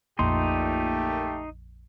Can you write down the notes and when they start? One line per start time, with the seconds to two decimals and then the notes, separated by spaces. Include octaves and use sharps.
0.19 A#1 F2 A#2 A3 D#4 G4 C6